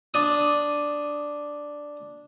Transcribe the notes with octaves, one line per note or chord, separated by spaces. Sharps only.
D4 D#6